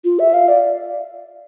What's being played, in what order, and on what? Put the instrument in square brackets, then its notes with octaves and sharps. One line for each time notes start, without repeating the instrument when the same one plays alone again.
[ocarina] F4
E5
F5
D5